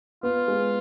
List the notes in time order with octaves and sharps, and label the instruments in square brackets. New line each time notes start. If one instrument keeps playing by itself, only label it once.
[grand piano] B3 [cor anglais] F4
[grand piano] G#3